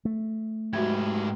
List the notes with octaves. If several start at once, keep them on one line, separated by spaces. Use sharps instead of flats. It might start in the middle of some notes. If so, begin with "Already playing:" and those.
A3
G#2 F#4 G4 E5 G#6